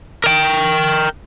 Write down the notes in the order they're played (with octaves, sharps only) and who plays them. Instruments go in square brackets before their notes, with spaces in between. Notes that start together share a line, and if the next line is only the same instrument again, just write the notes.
[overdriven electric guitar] A#4 G5